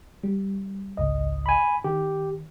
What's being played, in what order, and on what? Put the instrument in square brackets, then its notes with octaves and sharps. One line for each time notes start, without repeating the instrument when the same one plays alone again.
[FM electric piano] G3
G#1 C#2 D#5
[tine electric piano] G#5 B5
[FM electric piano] D#3 [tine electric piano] G4